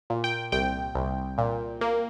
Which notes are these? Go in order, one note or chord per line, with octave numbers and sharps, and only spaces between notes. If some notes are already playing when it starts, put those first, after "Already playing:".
A#2
G5
C2 G5
C2
A#2
A#3